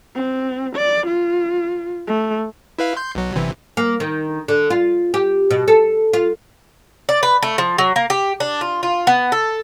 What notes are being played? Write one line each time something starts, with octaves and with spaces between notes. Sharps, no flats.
C4
D5
F4
A3
E4 B4 F5
C6 G6
B1 F#3
G1 C3 E3
A#3
D#3
D3
F4
G4
B2
A4
F4
D5
B4
A3
F3
F#3
A#3
G4
D4
F4
F4
B3
A4